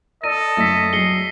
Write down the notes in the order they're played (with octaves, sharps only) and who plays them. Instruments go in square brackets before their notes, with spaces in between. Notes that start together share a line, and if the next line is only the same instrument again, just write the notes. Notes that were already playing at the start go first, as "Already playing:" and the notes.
[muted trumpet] A4 [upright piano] D5 [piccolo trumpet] D#5 [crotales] A#6 D#7
[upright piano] F#1 A3 [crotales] A#6 B6
[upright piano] F#3 G#4 [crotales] C7 C#7 G7